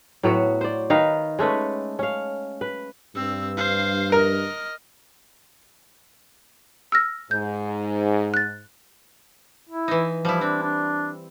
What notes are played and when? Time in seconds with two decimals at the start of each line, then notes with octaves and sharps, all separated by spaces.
0.23 A2 F#3 B3 F#4
0.61 C5 D5
0.90 D#3 D#4 B4 F5
1.39 G#3 A3 C#4 B4
1.99 C#4 F5
2.61 B4
3.15 G2 C4 E6
3.57 C5 F5
4.12 A#4 D#5 F6
6.92 E6 F6 A#6
7.31 G#2 G6
8.34 F#6 A6
9.70 E4
9.88 E3 D#4
10.25 F3 G3 E4
10.41 C4 D4
10.63 D4